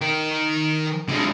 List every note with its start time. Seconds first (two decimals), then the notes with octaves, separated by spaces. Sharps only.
0.01 D#3 A#4
1.09 D3 G#3